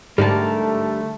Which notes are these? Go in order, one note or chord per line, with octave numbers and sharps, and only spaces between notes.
G#2 D3 G3 A3 G4 A#4 A5